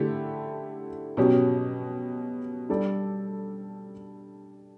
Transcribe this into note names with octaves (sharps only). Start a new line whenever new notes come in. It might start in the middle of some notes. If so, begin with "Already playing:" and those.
Already playing: D3 A3 E4 G4
B2 F#3 C#4 G4
G3 D4 A4 D5